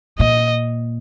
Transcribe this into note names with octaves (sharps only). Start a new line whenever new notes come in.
A#2 D#5